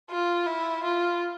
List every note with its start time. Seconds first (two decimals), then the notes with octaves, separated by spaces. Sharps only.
0.10 F4
0.46 E4
0.83 F4